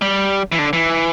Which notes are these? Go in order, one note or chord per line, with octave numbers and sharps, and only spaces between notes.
G3
E3
D3
E3